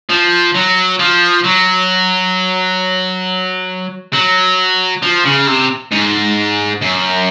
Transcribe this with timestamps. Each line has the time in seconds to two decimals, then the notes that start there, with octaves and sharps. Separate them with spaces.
0.10 F3
0.55 F#3
0.99 F3
1.44 F#3
4.13 F#3
5.03 F3
5.25 C#3
5.47 C3
5.92 G#2
6.82 F#2